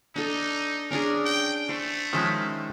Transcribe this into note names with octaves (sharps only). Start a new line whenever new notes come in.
D4 D#4 A4
C#4 D4 G#4 A#4
G5
A3 C5
D#3 F3 G#3 C#4 C5 E5